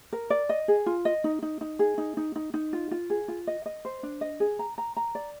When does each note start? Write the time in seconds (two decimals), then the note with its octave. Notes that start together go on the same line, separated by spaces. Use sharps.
0.13 A#4
0.30 D5
0.49 D#5
0.68 G#4
0.86 F4
1.05 D#5
1.24 D#4
1.42 D#4
1.61 D#4
1.79 G#4
1.98 D#4
2.17 D#4
2.36 D#4
2.54 D#4
2.73 F4
2.91 F4
3.10 G#4
3.28 F4
3.47 D#5
3.66 D#5
3.85 C5
4.03 D4
4.21 D#5
4.40 G#4
4.59 A#5
4.78 A#5
4.96 A#5
5.15 D5